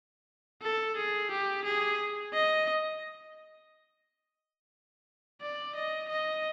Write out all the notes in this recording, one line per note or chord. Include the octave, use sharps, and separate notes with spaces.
A4
G#4
G4
G#4
D#5
D5
D#5
D#5